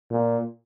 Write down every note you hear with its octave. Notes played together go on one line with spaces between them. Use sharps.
A#2